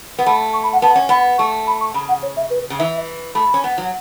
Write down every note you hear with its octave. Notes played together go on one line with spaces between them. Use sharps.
B3
A3 B5
C#6
B5
F#5
B3 A5
C#4
B3 B5
A3 C#6
B5
C#6
C#3 B5
F#5
C#5
E5
B4
C#3
E3 E5
A3 B5
C#4
B3
F#3